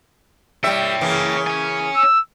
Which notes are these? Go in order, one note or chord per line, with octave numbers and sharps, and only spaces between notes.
G3 C#5 E5 G5
C#3 E3 A#3
C#5 G#5
E6